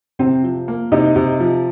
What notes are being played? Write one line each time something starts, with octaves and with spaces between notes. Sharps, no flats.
C3 C4
F3
A#3
C3 D#4
C3
F3